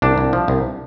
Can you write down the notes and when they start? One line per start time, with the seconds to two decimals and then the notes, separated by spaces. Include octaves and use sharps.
0.02 C2 D4
0.18 C2
0.33 F3
0.48 C2